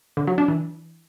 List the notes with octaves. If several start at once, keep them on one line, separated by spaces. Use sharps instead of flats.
D3
F#3
D4
E3